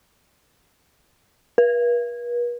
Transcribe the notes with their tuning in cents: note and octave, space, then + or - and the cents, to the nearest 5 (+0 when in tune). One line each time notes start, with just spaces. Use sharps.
B4 -45